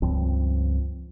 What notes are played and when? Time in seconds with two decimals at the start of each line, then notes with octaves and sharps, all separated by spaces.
0.02 C#2 G2 F3 C4